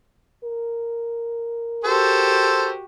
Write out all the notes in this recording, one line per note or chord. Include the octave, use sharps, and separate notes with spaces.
A#4
F#4 G4 A4 C5